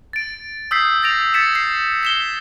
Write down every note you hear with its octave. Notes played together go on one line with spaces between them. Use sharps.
A6 D7
D#6 E6 G6 B6 C7
G6 A6 A#6 D7 F7
G#6 A6 B6 C#7 E7
C7
B6 E7 G7